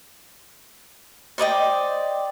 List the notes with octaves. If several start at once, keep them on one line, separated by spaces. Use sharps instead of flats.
C5 D5 D#5 G5